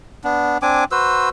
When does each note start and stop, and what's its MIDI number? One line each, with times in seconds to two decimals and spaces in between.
0.24 0.58 59
0.24 0.58 62
0.62 0.84 60
0.62 0.84 62
0.62 0.84 80
0.62 0.84 86
0.91 1.29 66
0.91 1.29 71
0.91 1.29 72
0.91 1.29 88